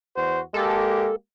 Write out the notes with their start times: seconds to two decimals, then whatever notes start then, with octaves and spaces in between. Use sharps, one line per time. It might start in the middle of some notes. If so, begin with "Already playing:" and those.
0.16 E2 F#4 C5
0.54 G#3 A#3 G4 A4